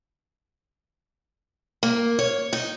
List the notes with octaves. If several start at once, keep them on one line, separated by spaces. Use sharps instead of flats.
A#3
C#5
D#4